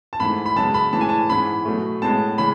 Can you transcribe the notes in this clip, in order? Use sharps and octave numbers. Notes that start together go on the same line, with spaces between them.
A5
G#2 E3 A3 B5
B5
F#2 C#3 G#3 B3 A5
B5
A2 E3 G#3 A5
G#5
A5
G#2 E3 G#3 B3 B5
B2 F#3 A3
A2 G#3 B3 A5
C#3 E3 G#3 B5